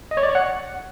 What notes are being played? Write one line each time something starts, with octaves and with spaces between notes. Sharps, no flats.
D#5
C#5
D5
C#5
F#5